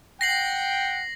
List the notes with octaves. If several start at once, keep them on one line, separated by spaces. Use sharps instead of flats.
F#5 G5 A#6 C7 F#7